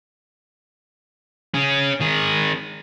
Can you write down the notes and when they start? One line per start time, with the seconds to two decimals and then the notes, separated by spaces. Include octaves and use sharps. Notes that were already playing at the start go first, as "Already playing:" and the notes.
1.54 C#4 G#4
2.00 D#3 G#4